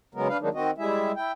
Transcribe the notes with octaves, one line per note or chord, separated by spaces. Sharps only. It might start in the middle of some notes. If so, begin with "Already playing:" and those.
C#3 F#3 G#3 B3 A#4
D4 B4 F5
D#3 F#3 G#3 A#3 D4 D#4
D#3 C4 F#4 D#5
G3 G#3 E4 G#4 E5
E4 G5